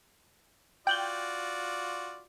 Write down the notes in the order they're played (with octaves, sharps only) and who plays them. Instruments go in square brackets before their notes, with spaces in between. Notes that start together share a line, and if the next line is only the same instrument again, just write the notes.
[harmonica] F4 F#4 D5 [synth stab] G5 F#6 G6